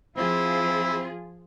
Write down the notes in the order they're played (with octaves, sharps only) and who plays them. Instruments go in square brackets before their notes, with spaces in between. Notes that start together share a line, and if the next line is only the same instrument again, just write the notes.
[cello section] F3 F4 G#4 [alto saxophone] C4 [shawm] E4